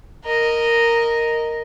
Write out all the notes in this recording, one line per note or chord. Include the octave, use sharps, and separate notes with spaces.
A#4 D#5